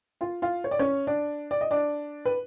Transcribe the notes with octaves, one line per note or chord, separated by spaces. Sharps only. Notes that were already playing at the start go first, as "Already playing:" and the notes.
F4 F5
F4 F5
C#5
D5
C#4 C#5
D4 D5
D5
D#5
D4 D5
B4